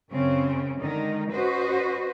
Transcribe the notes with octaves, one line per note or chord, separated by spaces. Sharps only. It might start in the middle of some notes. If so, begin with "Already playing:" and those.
F#2 C#3 C4 C#4
D3 D#3 G#3 D#4
C#4 F#4 B4 C5 D#5